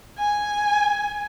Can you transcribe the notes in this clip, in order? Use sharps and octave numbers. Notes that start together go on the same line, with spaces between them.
G#5